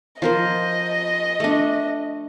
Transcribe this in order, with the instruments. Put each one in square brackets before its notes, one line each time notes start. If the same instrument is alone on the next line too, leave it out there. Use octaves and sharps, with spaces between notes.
[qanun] F3 A#4 C5 [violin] D#5
[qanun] A3 D4